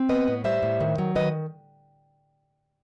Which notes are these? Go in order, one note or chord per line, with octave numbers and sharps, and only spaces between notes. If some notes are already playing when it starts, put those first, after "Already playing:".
Already playing: C4
B3 B4 D#5
A2
G3 C5 E5
A2
D#3
F#3
D#3 B4 D#5